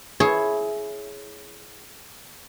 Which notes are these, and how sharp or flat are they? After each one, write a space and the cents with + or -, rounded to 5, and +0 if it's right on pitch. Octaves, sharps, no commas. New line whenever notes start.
E4 +0 G#4 +20 C#5 +0